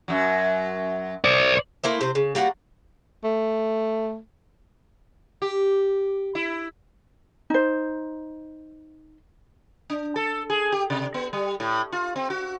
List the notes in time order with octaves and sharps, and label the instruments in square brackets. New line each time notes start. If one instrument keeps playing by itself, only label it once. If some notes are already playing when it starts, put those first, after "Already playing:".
[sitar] F#2 F#3
[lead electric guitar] C5 D5
[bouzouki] A3 A#3 E4 C5
C3 C5
C#3
G3 A#3 F#4 F#5
[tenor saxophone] A3
[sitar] G4
E4
[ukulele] D#4 C5
[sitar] D4
A4
G#4
G4
C3
B3
G3
A2
F4
C4
F#4